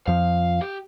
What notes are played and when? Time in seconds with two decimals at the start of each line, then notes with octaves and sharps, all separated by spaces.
0.08 F2 F3 F5
0.61 G4